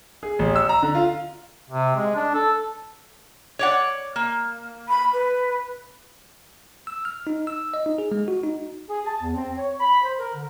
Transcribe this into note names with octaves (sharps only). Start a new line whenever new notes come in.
G#4
A1
E6
A#5
D3
F4
C3
G#3
D4
A4
C#5 D5 F#5
A#3
B5
B4
E6
F6
D#4
E6
D#5
D#4
G#4
G#3
F#4
D#4
G#4
A5
E2
C4
C#5
B5
C5
A#4
D3